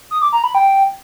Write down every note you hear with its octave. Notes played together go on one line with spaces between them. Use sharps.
D#6
D6
A#5
B5
G5